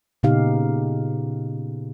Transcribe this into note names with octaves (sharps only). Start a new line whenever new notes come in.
A#2 C#3 B3 D#4 G4 F5